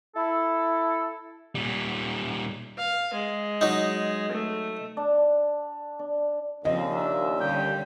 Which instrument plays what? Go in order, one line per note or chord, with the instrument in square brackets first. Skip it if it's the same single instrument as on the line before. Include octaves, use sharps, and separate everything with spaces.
[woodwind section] E4 A4
[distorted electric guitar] A#2 G3
[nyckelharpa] F5
G#3
[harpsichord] F#3 D#4
[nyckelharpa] A3
[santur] D4
D4
[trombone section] D#2 A#2 [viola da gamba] C#3 F3 C4 [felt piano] D#5
[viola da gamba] D4 [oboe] E5
[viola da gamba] D3 G3 C#4 [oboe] G5